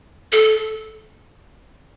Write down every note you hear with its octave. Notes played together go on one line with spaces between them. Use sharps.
A4